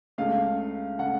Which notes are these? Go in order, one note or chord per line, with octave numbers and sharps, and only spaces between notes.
C#2 C#3 A3 F5
C#3 A3 F#5